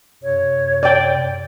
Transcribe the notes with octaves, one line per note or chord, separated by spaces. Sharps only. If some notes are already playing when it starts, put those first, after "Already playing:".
F#2 C3 C#5
D5 G5